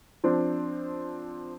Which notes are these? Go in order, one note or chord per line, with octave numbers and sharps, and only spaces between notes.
F3 C4 D4